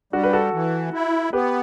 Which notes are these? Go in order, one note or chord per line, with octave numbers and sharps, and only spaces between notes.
G3 D4 F#4
B4
F#4 A4
E3
E4
B3 G4 B4